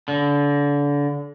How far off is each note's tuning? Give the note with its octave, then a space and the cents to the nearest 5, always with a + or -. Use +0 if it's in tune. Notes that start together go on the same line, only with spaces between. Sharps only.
D3 -30